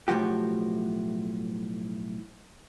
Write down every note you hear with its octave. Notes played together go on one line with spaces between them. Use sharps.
B1 A2 C3 F3 F#4 G4